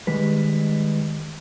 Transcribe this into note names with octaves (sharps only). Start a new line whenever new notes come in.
D#3 G3 G#3 B4